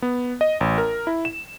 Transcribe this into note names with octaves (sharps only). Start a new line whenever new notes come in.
B3
D#5
A1
A#4
E4
E7